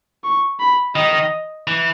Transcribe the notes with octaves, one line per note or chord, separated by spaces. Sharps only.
C#6
B5
D#3 D#5
E3